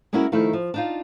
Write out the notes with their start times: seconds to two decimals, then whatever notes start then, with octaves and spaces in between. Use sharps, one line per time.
0.13 G#3 A#3 C#4 E4 F#4 A#4
0.32 D#3 F3 A3 D#4 E4
0.53 F3
0.74 D4 D#4 F4